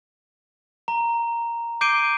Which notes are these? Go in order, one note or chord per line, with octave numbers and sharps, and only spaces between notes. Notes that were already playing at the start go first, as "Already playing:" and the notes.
A#5
D6 G6 C7 D7 D#7 G7